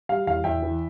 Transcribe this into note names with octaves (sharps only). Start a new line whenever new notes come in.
G3 F5
E2 F5
E2 E5 G5
E3